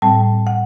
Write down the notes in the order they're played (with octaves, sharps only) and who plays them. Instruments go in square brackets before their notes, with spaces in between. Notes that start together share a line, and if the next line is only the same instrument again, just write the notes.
[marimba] A2 G3 C4 A5
F#5